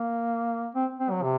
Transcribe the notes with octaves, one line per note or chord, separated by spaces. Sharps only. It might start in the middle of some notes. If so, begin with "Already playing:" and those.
Already playing: A#3
C4
C4
F#3
C3